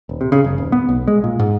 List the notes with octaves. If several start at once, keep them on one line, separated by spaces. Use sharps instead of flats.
D#1
C3
C#3
F#1
D#1
B3
B1
G#3
A#2
G#2